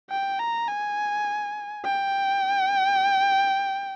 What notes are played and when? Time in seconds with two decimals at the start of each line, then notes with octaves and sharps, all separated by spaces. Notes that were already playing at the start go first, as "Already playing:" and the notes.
0.10 G5
0.39 A#5
0.68 G#5
1.85 G5